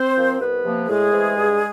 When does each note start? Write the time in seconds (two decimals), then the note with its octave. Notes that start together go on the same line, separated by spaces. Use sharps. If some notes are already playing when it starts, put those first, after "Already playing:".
Already playing: C4 C5
0.16 F3 A#3
0.40 C2 B3 B4
0.64 C3 F3 A#3
0.88 A2 G#3 G#4
1.13 E3 A3 C4
1.36 G2